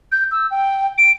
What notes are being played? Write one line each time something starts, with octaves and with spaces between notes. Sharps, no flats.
G6
E6
G5
D7